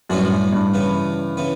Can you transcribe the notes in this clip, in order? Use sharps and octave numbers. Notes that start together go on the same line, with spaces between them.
F#2 A2 G3 B3 D4 F#4
G2
C#3 E3 B3
C#3 E3 B3